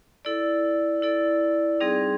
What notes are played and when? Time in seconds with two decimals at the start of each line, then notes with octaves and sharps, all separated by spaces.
0.25 E4 A4 D5
1.02 E4 A4 D5
1.81 G3 C4 D#4 G#4